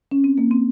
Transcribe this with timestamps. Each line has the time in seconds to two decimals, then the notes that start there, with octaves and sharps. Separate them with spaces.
0.12 C#4
0.24 C4
0.38 A#3
0.51 C4